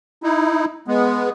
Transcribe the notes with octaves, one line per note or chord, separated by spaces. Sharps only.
D#4 E4
G#3 B3